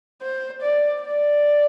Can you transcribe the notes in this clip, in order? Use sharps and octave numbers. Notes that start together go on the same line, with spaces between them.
C5
D5
D5